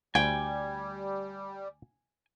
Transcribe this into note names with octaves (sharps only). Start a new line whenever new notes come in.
D2 G3 G5 G#5